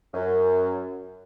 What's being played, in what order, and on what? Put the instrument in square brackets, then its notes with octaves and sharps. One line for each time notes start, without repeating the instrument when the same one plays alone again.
[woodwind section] F#2